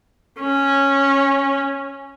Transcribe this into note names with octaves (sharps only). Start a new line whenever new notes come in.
C#4